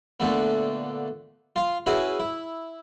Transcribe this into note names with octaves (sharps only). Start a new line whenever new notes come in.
A#2 D3 A3 B3
F4 F5
C#4 E4 F#4 G#4 B4
E4